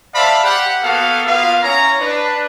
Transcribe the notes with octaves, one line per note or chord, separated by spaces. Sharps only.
C5 D5 E5 F5 A5 B5
G4 F#5
A#3 B3 F#4 A4 F5
A#3 B3 F4 F5
C#4 E4 C#5 A#5
D4 B4